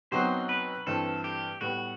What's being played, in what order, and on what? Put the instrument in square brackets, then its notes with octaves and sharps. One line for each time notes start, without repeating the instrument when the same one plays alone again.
[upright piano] B2 F#3 C4 D#4 F#4 [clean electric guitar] C5
[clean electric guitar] B4
[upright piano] G2 E3 A3 C4 [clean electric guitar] A4
[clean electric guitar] G4
[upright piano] A2 G3 B3 [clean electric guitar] F#4